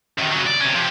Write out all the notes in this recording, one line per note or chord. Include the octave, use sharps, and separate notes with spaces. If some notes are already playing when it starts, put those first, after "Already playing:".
F#2 D#3
C#3 F#3
D5
C3 C#4
F3 G4